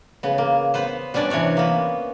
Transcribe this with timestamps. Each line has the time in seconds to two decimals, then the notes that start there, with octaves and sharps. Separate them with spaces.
0.23 C#3 B3
0.38 A#3
0.74 B3 B4 C5
1.14 G3 B3 C#4 D4 D5
1.30 C3 E3 C#4 C#5 D5
1.57 A#3 B3